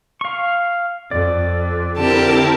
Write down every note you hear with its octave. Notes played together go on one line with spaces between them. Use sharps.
F5 C#6
F2 D5
D3 C4 E4 G4 A#4 A5